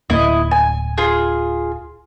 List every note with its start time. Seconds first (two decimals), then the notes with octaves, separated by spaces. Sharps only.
0.10 D1 A#3 E4 D#5
0.51 G#5
0.98 F4 G#4